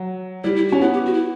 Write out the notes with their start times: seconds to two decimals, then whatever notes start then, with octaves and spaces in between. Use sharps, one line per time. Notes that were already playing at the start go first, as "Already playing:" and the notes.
Already playing: F#3
0.44 G3 E4
0.56 E4
0.69 F#4
0.72 C#4
0.81 B3 E4
0.93 G4
1.06 F#4
1.14 E4